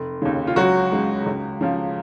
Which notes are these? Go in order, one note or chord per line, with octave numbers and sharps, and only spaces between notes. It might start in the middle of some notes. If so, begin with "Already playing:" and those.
Already playing: F1
D#2 C#3
F4
C#2 F#3 F#4
C#3 G#3
C#2
C#3 F3